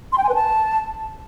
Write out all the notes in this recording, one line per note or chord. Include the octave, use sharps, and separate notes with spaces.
C6
G5
G#5
B4
A5